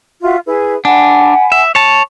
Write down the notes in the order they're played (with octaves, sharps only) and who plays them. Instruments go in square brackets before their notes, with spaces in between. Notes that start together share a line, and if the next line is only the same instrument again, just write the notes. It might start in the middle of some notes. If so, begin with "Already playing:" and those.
[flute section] F4 F#4 E5
E4 G#4 B4
[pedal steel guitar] D4 [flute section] F#5 G#5 B5
[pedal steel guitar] E5
C#5 A5